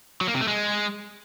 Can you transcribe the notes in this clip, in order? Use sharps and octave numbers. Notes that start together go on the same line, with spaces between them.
F#3
A#3
C3
A3
G#3